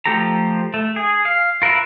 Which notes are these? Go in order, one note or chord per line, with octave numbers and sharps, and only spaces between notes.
F3 A3 G4 A4 A#5
A3
G#4
F5
F4 A#4 B4 E5